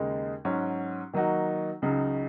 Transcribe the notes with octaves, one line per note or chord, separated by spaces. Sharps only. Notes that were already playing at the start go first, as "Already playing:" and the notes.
Already playing: D#2 C#3 G#3 D#4 G#4
G#2 F#3 C#4 F#4
D#3 F#3 A#3 D#4 F#4
C#2 C#3 F#3 D#4